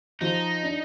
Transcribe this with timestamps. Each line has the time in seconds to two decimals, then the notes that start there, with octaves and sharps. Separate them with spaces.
0.21 F3 D#4
0.63 D4